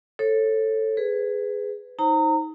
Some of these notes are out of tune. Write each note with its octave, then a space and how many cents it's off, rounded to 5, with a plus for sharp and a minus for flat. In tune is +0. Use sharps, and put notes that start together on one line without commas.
A4 +5 C#5 -25
G#4 +0 B4 +20
D#4 +25 C5 +25 A#5 -25